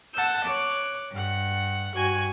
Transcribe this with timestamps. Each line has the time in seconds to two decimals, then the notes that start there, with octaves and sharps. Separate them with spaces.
0.14 F#5 A5 E6 G6
0.44 C#5 D6 F#6
1.12 G2 F#5
1.95 G2 F#4 G#5 G#6